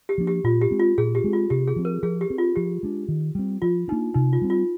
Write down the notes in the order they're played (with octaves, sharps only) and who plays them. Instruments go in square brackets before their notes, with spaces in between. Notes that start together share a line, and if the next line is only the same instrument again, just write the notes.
[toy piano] G4
[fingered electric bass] F3 A#3 D4
[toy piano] G4
[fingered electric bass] A#2 [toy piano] F4
[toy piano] G4
[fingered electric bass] G#3 C4
[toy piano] F4
[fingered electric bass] A#2 [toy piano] G#4
[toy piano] G4
[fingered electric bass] G#3 C4
[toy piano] F4
[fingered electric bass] C3 [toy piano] G4
[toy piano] G#4
[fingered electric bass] F3 C4
[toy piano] A#4
[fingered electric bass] F3 [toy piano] G#4
[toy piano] G4
[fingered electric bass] C4
[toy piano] F4
[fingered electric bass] F3 [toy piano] G4
[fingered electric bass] G#3 D4
D#3
G3 C4
[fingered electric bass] F3 [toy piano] F4
[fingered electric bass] D4 [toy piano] D#4
[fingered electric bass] A#3
[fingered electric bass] C3 [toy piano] D#4
[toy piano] F4
[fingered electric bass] G3 C4
[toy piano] F4